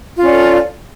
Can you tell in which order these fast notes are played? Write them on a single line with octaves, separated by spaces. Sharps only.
F4 C#4 D5 A4